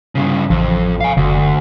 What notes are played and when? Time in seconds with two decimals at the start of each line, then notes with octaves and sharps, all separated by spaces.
0.15 G2 C#3
0.50 A1 F2
1.00 F5 G#5
1.17 F#1 D2